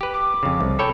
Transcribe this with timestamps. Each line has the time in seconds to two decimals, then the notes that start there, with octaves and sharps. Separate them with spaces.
0.01 G4 B4
0.14 D6
0.43 F2 C#3
0.61 C2
0.79 A4 C#5 G5 B5